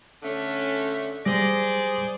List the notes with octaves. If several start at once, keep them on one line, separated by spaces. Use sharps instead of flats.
D3 A3 C#4
G3 G#4 C5 D5 A#6